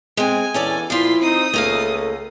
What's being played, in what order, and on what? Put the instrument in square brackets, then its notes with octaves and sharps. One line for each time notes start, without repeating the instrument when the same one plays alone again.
[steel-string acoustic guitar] G#3 C4 [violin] G#5
[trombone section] E2 [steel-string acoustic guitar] C#4 A4 D5
[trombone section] A#2 [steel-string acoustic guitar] F3 F4 [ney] E4 [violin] C6 B6
[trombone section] C4 D#4 [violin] D#6
[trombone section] C#2 [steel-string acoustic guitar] A3 A#3 F5 [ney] A4